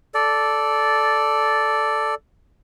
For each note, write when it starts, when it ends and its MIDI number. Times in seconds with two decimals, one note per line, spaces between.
0.14 2.15 69
0.14 2.15 74